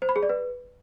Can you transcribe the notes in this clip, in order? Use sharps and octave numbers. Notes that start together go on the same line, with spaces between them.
C5
B5
G#4
D5
B4